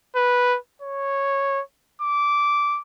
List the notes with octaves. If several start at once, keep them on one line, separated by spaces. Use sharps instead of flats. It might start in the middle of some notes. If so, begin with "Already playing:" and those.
B4
C#5
D6